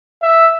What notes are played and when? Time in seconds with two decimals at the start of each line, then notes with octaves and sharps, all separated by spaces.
0.22 E5